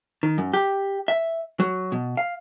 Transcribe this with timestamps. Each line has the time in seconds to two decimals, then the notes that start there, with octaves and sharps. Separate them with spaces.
0.23 D#3
0.38 F#2
0.53 G4
1.08 E5
1.60 F#3
1.92 B2
2.17 F5